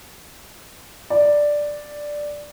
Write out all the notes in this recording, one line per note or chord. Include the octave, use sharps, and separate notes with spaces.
D5